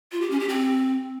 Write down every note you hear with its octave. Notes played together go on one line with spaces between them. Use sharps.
F4
G4
C#4
G4
C4